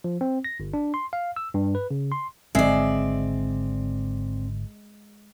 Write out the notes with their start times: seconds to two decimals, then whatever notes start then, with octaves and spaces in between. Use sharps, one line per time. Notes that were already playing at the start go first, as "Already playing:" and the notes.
0.04 F3
0.21 C4
0.44 A#6
0.60 G1
0.74 D4
0.94 C6
1.13 F5
1.36 E6
1.54 G2
1.75 B4
1.91 C#3
2.12 C6
2.55 G#1 G#2 D3 G#3 C4 D5 E5 C7